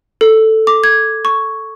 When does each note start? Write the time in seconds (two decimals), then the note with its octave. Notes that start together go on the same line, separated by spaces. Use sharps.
0.21 A4
0.67 D6
0.84 G#6
1.25 C#6